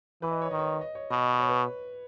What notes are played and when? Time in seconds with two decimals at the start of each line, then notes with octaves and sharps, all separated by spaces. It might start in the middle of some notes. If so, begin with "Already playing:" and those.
0.22 E3 B4
0.31 D#5
0.42 C#5
0.51 D#3 D#5
0.59 C#5
0.66 D#5
0.81 D#5
0.95 C#5
1.10 B2 D#5
1.35 D#5
1.40 C#5
1.49 B4